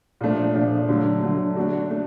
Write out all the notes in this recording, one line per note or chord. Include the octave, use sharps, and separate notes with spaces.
A#2 F3 A3 D4
A#2 F3 A3 D4
D3 F#3 A3
D3 F#3 A3
A3 D4 F#4
A3 D4